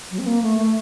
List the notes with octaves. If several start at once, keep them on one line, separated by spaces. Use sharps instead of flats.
F#3
C4
A#3
A3
A3